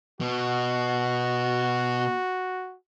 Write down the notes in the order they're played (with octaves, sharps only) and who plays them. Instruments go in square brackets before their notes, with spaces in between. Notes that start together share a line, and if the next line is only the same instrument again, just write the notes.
[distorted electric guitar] B2 [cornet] F#4